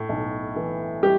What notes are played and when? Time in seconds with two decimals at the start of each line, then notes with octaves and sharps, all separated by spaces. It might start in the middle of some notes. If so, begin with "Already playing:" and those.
Already playing: A2
0.09 B1
0.56 E3
1.03 G3 G4